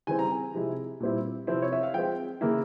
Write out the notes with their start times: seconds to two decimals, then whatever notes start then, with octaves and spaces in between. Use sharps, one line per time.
0.07 C#3 E3 G3 C4 E4 G#5
0.19 A#5
0.30 G#5
0.54 C3 F3 G#3 E4
1.00 A#2 G3 C4 E4
1.47 C3 F3 C4 E4
1.62 C#5
1.73 E5
1.83 F5
1.94 F3 G#3 C4 G5
2.41 C#3 E3 A#3 E4